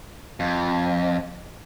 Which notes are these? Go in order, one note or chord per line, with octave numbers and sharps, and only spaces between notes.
F2